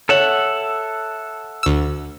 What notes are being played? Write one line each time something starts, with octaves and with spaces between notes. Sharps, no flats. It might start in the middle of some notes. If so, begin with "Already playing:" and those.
A4 C#5 E5 F#5
D2 E6